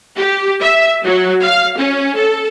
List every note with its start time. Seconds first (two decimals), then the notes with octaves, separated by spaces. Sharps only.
0.17 G4
0.61 E5
1.03 F#3
1.43 F5
1.78 C#4
2.16 A4